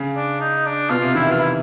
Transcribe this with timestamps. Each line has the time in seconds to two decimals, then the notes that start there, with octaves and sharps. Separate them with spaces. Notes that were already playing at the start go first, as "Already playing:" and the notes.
Already playing: C#3
0.16 D4
0.41 D#4
0.65 D4
0.89 B2 F4
1.02 C3
1.14 D#3 E4
1.26 E3 F4
1.39 E4